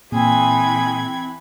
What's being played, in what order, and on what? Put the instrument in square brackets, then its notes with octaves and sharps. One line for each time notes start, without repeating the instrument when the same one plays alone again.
[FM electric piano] A#2 [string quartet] E3 B5 G#6 [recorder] C4 [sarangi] G#4